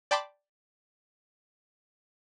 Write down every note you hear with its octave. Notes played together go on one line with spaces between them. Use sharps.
D5 G5 A5 B5 C6 D6